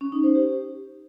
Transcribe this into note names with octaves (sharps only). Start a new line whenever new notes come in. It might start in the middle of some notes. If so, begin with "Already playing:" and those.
C#4
D#4
C5
G4